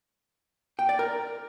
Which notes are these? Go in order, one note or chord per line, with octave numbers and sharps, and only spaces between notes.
G5
D5
A#4